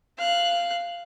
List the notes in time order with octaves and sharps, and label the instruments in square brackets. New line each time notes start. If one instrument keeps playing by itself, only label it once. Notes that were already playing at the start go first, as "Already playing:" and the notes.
[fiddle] F5 F#6